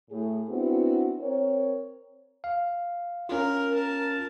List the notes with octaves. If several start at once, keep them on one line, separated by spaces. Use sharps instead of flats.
A2 G#4
B3 C4 D4 E4 F#4
C4 A#4 C#5
F5
C#4 F4 A#4
A#4 A5